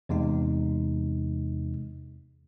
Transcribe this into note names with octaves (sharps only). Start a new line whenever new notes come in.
E2 C3 G#3 D#4